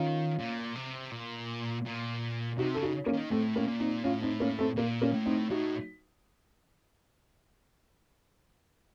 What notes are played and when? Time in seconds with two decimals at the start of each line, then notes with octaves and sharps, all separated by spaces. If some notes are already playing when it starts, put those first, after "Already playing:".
Already playing: D#3 C#4 F4
0.39 A#2
0.75 C3
1.12 A#2
1.85 A#2
2.57 C3 D#4 F#4
2.74 C#3 A4
2.83 D#4 F#4
3.06 A#3 C#4
3.13 D#3
3.31 A2 A3 C4
3.55 A#3 C#4
3.68 A#2
3.80 C4 D#4
4.04 A2 C#4 F4
4.22 C4 D#4
4.40 A#3 C#4
4.59 A3 C4
4.77 A#2 A#3
5.02 A#3 C#4
5.13 A2
5.26 C4 D#4
5.50 A2 D#4 F#4